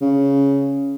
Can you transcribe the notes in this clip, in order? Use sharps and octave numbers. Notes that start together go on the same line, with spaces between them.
C#3